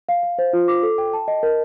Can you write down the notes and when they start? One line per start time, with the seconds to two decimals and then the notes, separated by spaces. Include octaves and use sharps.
0.09 F5
0.23 F5
0.39 C5
0.53 F4
0.68 D6
0.83 A4
0.98 G5
1.13 A5
1.28 D#5
1.43 A#4